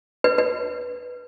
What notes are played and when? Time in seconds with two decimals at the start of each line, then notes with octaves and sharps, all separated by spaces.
0.24 B4
0.38 B4